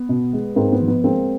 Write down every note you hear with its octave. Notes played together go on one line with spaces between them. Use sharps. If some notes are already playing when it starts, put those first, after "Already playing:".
Already playing: B3
B2
G#3
G#2 A#3 C4
B3
F3
B3
G#3 A#3 C4